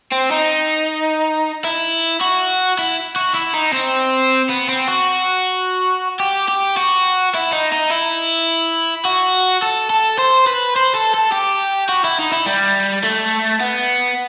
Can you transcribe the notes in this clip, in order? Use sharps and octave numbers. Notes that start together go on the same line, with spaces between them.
C4
D#4
E4
F#4
E4
F#4
E4
D#4
C4
B3
C4
F#4
G4
G4
F#4
E4
D#4
D#4
E4
F#4
A4
A4
C5
B4
C5
A4
A4
G4
F#4
E4
D#4
E4
G3
A3
B3